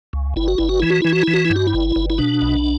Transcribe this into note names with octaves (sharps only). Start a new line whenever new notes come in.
C#2
G1 E4
F#4
G1 E4
F#4
E3 E4
F#4
E3 E4
F#4
E3 E4
F#4
E4
G2
F#4
E4
G1
G1
E4
B2 D4
B1